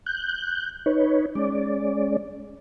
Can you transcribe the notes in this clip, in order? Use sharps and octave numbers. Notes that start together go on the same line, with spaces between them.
F#6 G6
D#4 B4 C#5
G#3 C#4 D5